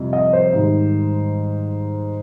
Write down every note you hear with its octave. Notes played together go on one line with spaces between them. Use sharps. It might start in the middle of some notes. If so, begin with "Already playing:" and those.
Already playing: F2 C3 G3
D#5
C5
G#2 D#3 G3